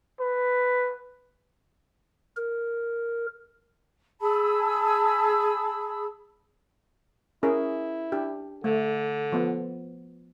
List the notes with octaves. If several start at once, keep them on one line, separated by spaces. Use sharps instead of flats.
B4
A#4
G#4 A5 B5 E6
C#4 E4 G#4 A#4
D4 G4
D3 A3
F3 B3